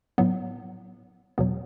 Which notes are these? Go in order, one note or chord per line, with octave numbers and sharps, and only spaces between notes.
A2 F#3 B3
E2 B2 F#3 B3